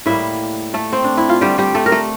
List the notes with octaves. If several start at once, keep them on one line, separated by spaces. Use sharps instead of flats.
A2 G3 A#3 E4 E5
A3 A4
C4
D4
E4
F4
D3 G3 A3 G4
G3 G4
A3 A4
A#4
A3 A4